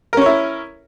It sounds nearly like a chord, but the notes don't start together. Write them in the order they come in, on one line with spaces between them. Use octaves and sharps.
A#4 C#4 C#5 E4